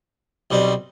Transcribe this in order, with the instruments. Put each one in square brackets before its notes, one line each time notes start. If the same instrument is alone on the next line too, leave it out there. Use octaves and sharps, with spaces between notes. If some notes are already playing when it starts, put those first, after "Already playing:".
[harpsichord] B1 B2 G3 C4